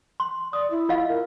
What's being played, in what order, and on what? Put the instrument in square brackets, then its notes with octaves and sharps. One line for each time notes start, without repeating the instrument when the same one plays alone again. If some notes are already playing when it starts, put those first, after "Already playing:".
[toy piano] C6
[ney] D5 [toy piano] D#6
[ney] E4
[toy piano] F4 D#5 F5
[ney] A#4